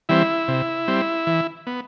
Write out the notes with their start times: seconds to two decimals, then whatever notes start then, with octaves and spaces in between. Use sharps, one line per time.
0.09 E3 G3 C4 E4
0.48 C3
0.88 G3 C4
1.27 E3
1.67 B3